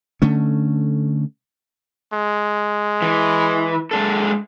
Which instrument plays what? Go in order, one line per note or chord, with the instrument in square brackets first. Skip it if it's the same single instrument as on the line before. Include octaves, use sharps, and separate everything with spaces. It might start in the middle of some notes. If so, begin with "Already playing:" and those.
[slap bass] D3 A3 C#4
[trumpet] G#3
[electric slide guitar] E3
G#3 D4 A4